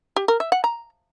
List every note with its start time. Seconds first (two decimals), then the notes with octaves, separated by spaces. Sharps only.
0.16 G4
0.28 A#4
0.40 E5
0.52 F#5
0.64 A#5